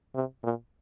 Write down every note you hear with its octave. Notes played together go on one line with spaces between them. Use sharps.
C3
A#2